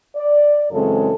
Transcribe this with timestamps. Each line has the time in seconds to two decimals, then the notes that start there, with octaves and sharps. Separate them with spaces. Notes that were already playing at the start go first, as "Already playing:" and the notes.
0.16 D5
0.71 F#2 C#3 E3 G#3 C4 A4